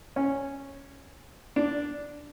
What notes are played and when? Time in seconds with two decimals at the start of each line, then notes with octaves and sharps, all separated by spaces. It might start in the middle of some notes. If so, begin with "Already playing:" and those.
0.16 C#4
1.56 D4